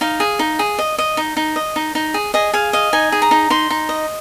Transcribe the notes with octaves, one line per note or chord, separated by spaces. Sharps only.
D#4 F5
G#4
D#4
G#4
D#5
D#5
D#4
D#4
D#5
D#4
D#4
G#4
G#4 D#5
G#4 F5
D#5 F5
D#4 G#5
G#4
A#5
D#4
D#4 C6
D#4
D#5